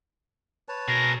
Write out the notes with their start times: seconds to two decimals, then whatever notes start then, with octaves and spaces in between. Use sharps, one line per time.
0.69 B4 C#5 A5
0.88 B2 G#4 A#4 A#6